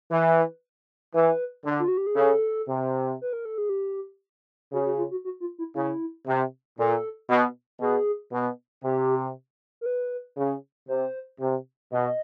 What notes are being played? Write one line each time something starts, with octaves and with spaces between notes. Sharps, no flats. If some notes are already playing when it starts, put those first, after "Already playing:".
E3 B4
E3 B4
D3
F4
F#4
G4
G#4
C#3 A4
C3
B4
A#4
A4
G#4
G4
C#3 F#4
F#4
F4
F#4
F#4
F4
E4
C#3 E4
C3
A#2 A4
B2
B2 G#4
B2
C3 G4
A#4
B4
C#3
C3 C5
C3
B2 D#5